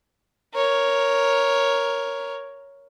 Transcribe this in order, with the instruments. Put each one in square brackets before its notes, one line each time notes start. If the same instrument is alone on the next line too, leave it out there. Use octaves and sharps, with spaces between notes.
[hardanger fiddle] A#4 C#5